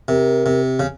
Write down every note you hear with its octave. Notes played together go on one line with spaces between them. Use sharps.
C3 A#4
C3
C#3